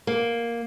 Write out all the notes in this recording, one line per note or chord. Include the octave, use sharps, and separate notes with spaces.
A#3